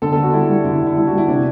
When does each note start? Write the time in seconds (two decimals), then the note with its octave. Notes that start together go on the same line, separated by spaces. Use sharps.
0.02 D3 A4
0.12 D3 A4
0.23 F#4
0.33 G3 E4
0.49 G3
0.65 D3 E4
0.81 D3
0.86 E4
0.97 G3 E4
1.07 F#4
1.13 G3 E4
1.28 C3 D4